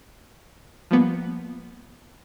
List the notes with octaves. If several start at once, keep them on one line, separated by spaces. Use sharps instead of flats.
F3 G3 A#3 B3